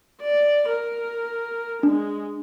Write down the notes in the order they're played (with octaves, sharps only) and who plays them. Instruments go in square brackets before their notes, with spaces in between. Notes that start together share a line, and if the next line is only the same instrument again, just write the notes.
[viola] D5
A#4
[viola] G#3 [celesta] D4